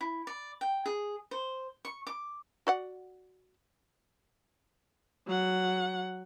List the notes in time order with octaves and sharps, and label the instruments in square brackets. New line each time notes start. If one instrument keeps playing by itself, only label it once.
[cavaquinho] E4
D5
G5
G#4
C5
C#6
D6
[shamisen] F#4 D5 F#5
[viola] F#3 F#5